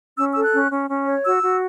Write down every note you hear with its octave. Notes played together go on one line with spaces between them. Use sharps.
C#4 E6
A4 E6
F#6
C#4
C#4
C#4
C#5
F#4 E6
F#4